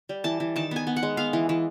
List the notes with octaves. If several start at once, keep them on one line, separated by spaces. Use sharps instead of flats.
G3
E3 A5
E3
D#3 A5
B3 G#5
B3
F#5
G#3
B3 F5
E3
E3